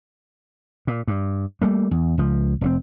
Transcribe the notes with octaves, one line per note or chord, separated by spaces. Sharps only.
A#2
G2
G3 A3 A#3
E2
C#2 F3
F1 B2 C4